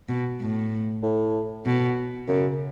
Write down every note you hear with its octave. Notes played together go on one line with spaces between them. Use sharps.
B2
A2
A2
B2
F#2 C#3